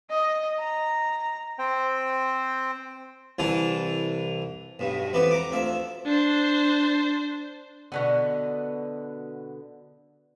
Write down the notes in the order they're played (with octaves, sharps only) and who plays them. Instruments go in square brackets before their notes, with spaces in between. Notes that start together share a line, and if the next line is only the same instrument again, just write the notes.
[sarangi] D#5
A#5
[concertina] C4 C5 G5
[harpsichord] C2 E3 A5
B1 G2 B2
F2 E3 B3 G4 B4
A#5 D6
D2 F3 E5
[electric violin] D4 C5
[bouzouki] B2 D3 B3